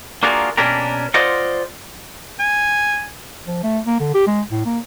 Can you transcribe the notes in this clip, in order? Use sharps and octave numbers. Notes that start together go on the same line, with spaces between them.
A#3 D4 F4 F#4 G#4 A#4
B2 A#3 C#4 D4 G4 A#4
F4 C5 D5 D#5 F#5
G#5
F3
A3
A#3
D3
G4
G#3
A2
A#3